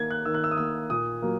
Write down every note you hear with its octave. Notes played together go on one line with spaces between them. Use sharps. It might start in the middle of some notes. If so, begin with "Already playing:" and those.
Already playing: D#3 A#3 G#6
F#6
D#3 E6
F#6
E6
D#6
A#3 E6
A#2 D#6
F#3 A#3